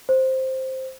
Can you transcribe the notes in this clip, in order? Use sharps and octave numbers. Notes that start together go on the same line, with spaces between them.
C5